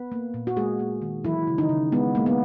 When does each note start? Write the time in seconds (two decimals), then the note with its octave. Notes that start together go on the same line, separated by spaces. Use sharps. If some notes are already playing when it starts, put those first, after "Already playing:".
Already playing: B3 B4
0.12 A#3
0.34 A#2
0.47 F#4
0.56 G#3 A#3 G#4
0.79 A#3
1.02 D#3
1.24 E3 F#3 E4
1.47 C#3
1.58 D#3 D#4
1.69 C#3
1.92 G#3 B3
2.15 G#3 A#3
2.26 B3